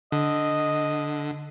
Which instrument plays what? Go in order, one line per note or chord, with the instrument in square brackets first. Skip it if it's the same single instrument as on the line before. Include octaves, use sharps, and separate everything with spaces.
[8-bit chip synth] D3 [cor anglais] D#5